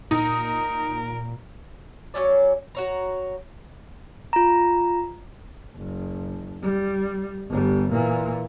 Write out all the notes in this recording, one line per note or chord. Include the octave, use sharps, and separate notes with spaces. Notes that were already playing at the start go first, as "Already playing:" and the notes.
A#2 D#4 A#4
F#3 B3 C#4 D5
F#4 C#5 A#5
F4 A#5
F#1
G3
G1 G3
A#2 E3